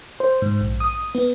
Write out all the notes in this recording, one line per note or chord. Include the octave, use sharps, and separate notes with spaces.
C5
G#2
A#1
D#6
B3